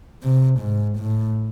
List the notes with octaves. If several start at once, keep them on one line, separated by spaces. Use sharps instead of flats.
C3
G#2
A2